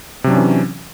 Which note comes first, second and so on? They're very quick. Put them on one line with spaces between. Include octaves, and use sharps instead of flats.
C3 F#3 D4 C#4 E3